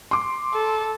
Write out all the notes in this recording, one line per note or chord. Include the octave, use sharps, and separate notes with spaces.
C6 D6
A4